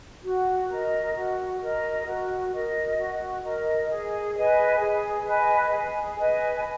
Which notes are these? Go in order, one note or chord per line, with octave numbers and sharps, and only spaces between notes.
F#4
A#4 D#5
F#4
A#4 D#5
F#4
A#4 D#5
F#4
A#4 D#5
G#4
B4 D#5 G#5
G#4
B4 D#5 G#5
G#4
B4 D#5 G#5